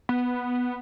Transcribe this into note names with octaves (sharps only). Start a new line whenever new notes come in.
B3